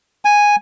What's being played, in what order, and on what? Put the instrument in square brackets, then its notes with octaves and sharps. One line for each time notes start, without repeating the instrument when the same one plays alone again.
[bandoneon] G#5